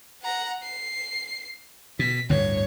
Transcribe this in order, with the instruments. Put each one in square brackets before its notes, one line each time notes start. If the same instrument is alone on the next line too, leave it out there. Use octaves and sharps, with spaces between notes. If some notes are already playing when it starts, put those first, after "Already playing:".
[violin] F#5 A#5
C7
[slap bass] B2 [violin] B6
[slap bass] G1 D2 A2 [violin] C#5